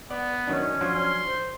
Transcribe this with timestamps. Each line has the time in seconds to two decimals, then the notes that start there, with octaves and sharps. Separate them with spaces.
0.11 B3 D5
0.47 D#3 F#3 C#4 D4
0.81 F3 F#3 D4 C6
1.27 C5